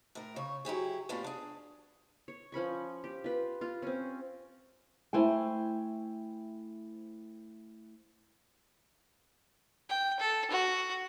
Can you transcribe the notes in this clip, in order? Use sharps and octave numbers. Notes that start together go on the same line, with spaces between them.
A2 A#4
C#3 C#5
F#3 E4 G4 G#4
A2 A#3 B3 D4 F4 G4
D4 G#4
C#5
F3 C#4 B5 C#6
G4
F4 B4
F4 F5
C4 C#4
A3 E4 C5 G5 G#5
G5
A4
F#4